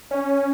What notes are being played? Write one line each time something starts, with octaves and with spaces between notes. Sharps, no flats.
C#4